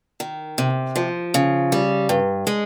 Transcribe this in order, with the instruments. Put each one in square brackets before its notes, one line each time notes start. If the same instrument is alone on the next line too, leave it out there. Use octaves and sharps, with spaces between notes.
[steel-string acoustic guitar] D#3
C3
F3
C#3
G3
G2
G#3